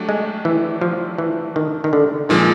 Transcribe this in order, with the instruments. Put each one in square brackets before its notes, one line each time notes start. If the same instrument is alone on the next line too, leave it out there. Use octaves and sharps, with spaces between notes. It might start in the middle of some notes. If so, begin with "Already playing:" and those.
Already playing: [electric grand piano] F#3 A3 D4 G4
[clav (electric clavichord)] G#3
E3
F3
E3
D#3
D#3
D3
[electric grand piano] A#2 F3 G#3 [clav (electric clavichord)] D#3